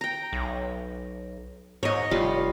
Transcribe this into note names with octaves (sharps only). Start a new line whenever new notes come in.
G5 A#5
B1
G#2 C#5 D#5
F1 G3 F4